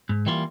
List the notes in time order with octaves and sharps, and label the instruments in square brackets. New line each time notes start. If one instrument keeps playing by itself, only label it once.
[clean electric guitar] G#2
E3 G3 A#3 F4